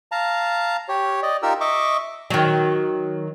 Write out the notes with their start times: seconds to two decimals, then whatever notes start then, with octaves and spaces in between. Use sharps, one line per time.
0.12 F5 A5 A#5
0.88 G4 C#5
1.23 D5 D#5
1.43 D#4 F4 G4 A#4 E6
1.61 D#5 E5 C#6 D6
2.30 D#3 F#3